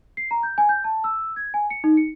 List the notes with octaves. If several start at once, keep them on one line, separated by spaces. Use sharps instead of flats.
C7
A#5
G6
G#5
G6
A5
E6
G#6
G#5
C#7
D#4
C#7